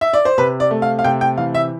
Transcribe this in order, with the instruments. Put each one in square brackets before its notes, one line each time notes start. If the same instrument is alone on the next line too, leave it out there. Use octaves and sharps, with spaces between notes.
[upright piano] E5
D5
C5
C3 B4
D5
A3
F5
F5
C3 G5
G5
E3 F5
E5